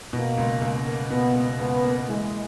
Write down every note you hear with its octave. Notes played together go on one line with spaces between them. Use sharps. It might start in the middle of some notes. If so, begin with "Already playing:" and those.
B2 A#3
C#2
C#2
A#3
B2 B3
C#2
C#2 B3
A#3
E3 G#3